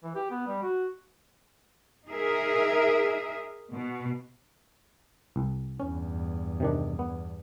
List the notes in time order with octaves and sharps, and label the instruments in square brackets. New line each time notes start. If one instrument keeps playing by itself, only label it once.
[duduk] E3
G4
B3
G3
F#4
[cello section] D#4 G#4 A#4 E5
B2
[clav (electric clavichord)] C2
[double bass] E2 G2 [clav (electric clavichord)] C#4
[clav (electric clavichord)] C3 D#3 D4
B3